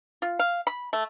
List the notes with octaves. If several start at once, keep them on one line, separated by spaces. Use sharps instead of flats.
F4
F5
B5
A3